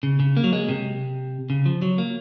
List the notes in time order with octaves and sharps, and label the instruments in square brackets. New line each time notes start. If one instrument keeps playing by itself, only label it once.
[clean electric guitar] C#3
C#3
A#3
F#3
G#3
C3
C#3
F3
F#3
A#3